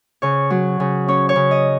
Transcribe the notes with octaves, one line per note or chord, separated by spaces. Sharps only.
C#3 C#5
F#3
C#3
C#4 C#5
C#5
C#3
D#5